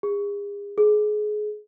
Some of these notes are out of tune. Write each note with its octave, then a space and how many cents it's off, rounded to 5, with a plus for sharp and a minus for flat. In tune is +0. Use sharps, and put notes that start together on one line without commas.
G#4 -40
G#4 +25